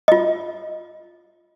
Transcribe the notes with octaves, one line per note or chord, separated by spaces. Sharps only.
F4 D#5